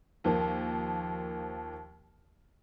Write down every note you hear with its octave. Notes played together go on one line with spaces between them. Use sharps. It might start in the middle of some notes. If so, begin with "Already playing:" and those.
D#2 F3 A#3